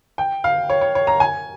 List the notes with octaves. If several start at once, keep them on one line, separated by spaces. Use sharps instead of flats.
G5
F5
C#5
C#5
C#5
A#5
G#5